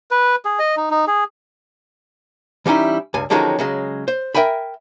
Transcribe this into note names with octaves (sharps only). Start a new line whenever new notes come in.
B4
G#4
D#5
D#4
D#4
G#4
E3 G3 C#4 D#4 E4
C#2 G2 G#5
D3 D#3 F3 F#3 G#3 C#4
C#3 F#3 G#3
C5
A#4 E5 G5 G#5 B5